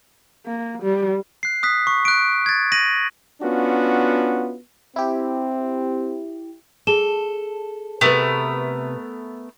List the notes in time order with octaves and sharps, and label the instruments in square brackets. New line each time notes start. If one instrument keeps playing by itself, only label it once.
[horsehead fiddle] A#3
G3
[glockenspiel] F#6 C7
D#6 F#6 B6 C7
C#6
F#6 D7
G#6 A6
A#6 D#7 F#7
[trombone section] B3 C#4 D4 F4 F#4
[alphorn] C4 [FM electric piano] E4 G4
[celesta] G#4 E7 G7 [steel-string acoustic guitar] A4
[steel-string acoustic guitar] C3 B4 [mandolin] A3 B3 A#4